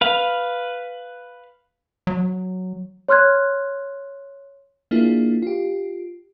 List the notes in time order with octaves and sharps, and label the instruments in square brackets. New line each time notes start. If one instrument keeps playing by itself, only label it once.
[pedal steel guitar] B4 F5
[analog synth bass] F#3
[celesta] C#5 C6 F6 F#6 G#6
[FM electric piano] A#3 D4 E4 F4 G#4
F4 G4